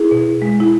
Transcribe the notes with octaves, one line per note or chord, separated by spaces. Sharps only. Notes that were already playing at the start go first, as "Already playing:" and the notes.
Already playing: E4 G#4
B2
G#3
E4